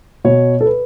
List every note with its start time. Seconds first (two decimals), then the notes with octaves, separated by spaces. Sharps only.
0.24 B2 C#5
0.61 A4
0.66 B4